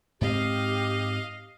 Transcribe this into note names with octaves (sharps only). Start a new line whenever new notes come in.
G#2 C4 G4 D#5 F5